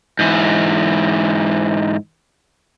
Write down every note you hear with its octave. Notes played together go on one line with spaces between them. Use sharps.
G#2 E3